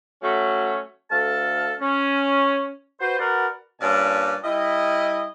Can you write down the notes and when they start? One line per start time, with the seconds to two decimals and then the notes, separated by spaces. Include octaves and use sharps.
0.22 F#3 A3 C#4 F#4
1.11 D2 A4 F5 A5
1.81 C#4
3.01 F#4 B4 C5
3.19 F#4 A#4 B4 D5 F#5
3.81 G2 A#2 C#4 D5 A5
4.44 G3 E4 D#5